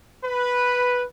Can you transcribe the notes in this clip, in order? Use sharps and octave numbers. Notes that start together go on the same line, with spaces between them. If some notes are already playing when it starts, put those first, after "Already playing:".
B4